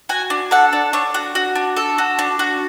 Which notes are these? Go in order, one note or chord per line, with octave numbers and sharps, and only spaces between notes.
F#4 G#5
D4
A4 F#5
D4
D4 C#5
F#4
F#4
D4
A4
F#4
D4
F#4